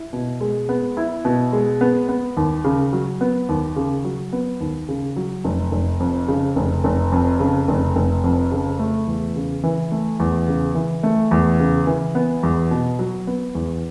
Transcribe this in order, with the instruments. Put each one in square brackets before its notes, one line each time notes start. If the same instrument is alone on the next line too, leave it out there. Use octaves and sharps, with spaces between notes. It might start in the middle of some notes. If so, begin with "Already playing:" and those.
Already playing: [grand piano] E4
B2
G#3
B3
E4
B2
G#3
B3
B3
D#2
C#3
F#3
B3
D#2
C#3
F#3
B3
D#2
C#3
F#3
F1
F1
F2
C#3
F1
F1
F2
C#3
F1
F1
F2
C#3
A3
E2
C#3
E3
A3
E2
C#3
E3
A3
E2
C#3
E3
B3
E2
B2
F#3
B3
E2